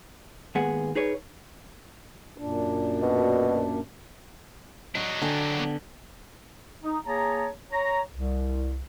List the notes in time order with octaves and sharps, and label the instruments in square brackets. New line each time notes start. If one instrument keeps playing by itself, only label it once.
[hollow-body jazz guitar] D#2 G#2 G#3 B3 G#4 F#5
D#4 G#4 B4 C#5
[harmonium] F#2 A#2 D4
[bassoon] B2
[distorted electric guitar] F#3 D4 [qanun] D#5
[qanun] D3 G5 G#5
B3
[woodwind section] D#4
A#3 G#4 C#5 A5 A#5
C#5 A#5
C2